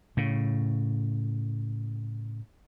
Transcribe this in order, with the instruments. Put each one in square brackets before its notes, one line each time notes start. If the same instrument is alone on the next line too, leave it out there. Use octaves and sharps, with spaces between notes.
[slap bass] A2 C#3